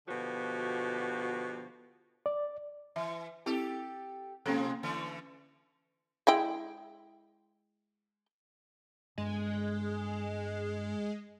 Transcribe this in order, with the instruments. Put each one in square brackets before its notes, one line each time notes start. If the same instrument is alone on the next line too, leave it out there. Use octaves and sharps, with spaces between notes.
[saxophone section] B2 D3 F3 F#4 G4
[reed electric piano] D5
[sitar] E3 [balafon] E5
[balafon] C4 E4 [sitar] G4 A4
[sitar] B2 F3 G#3 [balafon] A#3 C#4 A4
[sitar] D3 E3 A3
[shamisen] G#3 E4 G5
[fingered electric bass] G2 B3 D4 [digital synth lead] G#3